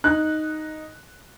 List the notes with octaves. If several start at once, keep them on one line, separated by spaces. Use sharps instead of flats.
D#4 F#6